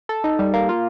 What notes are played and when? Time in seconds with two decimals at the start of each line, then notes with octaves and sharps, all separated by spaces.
0.09 A4
0.24 D#4
0.39 G3
0.54 A#3
0.69 F4